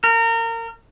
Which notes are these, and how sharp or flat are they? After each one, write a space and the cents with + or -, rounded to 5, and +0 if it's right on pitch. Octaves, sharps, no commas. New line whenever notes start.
A#4 -30